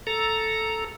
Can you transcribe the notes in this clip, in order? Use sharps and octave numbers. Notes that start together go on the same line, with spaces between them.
A4 A#5